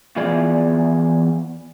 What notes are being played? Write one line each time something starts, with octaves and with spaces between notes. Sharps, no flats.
E2 E3 B3 F4 G#4 D5